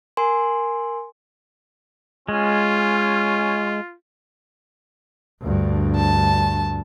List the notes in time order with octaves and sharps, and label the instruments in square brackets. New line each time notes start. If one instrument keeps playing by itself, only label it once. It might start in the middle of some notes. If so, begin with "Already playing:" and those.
[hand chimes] A#4 G#5 C6
[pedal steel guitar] G#3 [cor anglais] C#4 [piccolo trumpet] F4
[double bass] D2 G2
[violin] A5